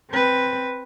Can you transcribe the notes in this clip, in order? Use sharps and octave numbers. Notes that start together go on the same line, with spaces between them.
C4 B4